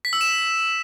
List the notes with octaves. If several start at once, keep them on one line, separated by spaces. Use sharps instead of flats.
B6
E6
E7